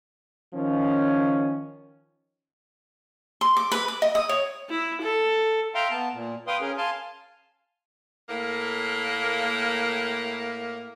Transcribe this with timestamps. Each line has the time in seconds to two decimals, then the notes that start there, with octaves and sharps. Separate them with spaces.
0.54 D#3 F3 C#4
3.41 C6
3.57 D6
3.72 B4
3.88 D6
4.02 D#5
4.15 D#6
4.29 C#5
4.69 E4
5.01 A4
5.75 E5 F5 G5 A#5 C6
5.91 B3 A5
6.14 A#2
6.47 B4 F5 G5 C6 D#6
6.61 C#4 G#4 A#4
6.77 F5 G#5 A5 C6
8.29 A2 A#3